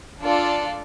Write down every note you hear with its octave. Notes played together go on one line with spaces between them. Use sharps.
D4 F4 A4 D5